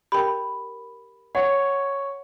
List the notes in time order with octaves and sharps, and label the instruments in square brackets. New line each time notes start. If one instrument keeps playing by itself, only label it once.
[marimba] G4 G5 [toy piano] A#4 B5
[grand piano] C#5 [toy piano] F#5